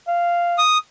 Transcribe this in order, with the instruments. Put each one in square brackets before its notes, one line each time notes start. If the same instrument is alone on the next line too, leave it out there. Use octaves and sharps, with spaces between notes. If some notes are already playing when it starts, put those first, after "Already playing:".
[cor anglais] F5
[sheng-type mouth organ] D#6